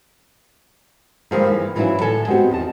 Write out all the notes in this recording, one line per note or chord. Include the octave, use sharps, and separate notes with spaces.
G2 D3 F3 G#3 A#3
E3
E3 F#3 C#4 E4 F4
A2 D3 D4 A4 G#5
G#3 B3 C4 F#4 G4
E2 D#5 A5